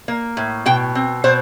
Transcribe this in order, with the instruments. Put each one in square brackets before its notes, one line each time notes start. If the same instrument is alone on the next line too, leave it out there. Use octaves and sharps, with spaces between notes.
[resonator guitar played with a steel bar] A#3
A2
B2 G5
C4
B2 C5